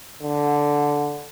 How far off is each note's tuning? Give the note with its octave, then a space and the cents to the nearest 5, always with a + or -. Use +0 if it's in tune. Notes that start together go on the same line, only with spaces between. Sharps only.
D3 -10